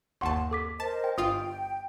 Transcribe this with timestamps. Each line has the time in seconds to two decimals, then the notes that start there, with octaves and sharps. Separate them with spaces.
0.21 G1 D#2 F#5 A5 C6 C#6
0.51 A4 D6 B6
0.80 A#4 C5 D#5 A5
1.04 G5
1.18 G1 F4 G5 D#6 C7